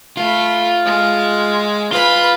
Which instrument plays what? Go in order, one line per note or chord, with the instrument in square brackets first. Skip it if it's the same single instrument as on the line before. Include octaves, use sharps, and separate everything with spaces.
[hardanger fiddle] A3 B5 [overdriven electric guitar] F4
[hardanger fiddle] G#3
[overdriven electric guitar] F4 [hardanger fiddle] B4 B5